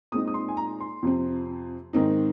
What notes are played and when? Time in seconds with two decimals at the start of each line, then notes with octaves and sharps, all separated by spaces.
0.12 A#2 G#3 C4 D#4 D#6
0.27 D#6
0.34 C6
0.48 G#5
0.57 A#5
0.80 C6
1.02 F2 C3 F3 C4
1.93 G#2 D#3 C4 D#4